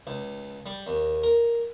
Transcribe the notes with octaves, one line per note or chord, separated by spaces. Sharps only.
C#2
G3
D#2
A#4